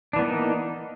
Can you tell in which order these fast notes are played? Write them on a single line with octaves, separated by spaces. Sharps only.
D4 E3 B3 A#3 D#4